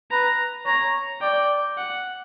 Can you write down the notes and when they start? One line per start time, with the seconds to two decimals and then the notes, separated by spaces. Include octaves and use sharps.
0.11 B4 A#5
0.66 C#5 A#5
1.21 D5 G5
1.77 F#5